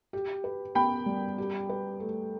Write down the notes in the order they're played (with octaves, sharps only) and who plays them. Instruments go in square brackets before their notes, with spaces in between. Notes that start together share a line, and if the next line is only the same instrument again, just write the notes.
[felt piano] G4
B4
[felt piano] B3 [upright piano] G5 B5
[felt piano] G3
G4
B4
A3